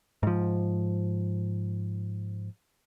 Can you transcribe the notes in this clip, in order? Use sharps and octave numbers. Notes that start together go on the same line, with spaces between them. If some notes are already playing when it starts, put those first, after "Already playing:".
G#2 F3